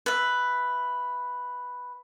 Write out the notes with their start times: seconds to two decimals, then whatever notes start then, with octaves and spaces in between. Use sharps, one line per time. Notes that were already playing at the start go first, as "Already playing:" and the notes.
0.06 B4 E5